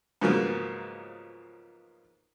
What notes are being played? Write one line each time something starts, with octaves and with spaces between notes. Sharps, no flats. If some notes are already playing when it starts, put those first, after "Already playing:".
G#2 C#3 F3 F#3 A#3 B3